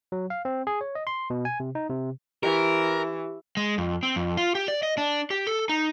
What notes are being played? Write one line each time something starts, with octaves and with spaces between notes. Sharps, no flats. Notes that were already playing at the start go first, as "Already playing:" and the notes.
F#3
F5
C4
G#4
C#5
D#5
C6
B2
G#5
C3
D#4
C3
E3 G4 A#4
G#3
F2
C4
F2
F4
G4
D5
D#5
D4
G4
A4
D#4